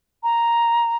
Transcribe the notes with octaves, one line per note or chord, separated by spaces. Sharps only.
A#5